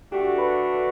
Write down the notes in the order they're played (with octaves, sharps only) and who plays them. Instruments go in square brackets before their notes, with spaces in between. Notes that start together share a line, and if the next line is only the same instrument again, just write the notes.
[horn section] D3 A3 D4 F#4 [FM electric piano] G4
[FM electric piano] B4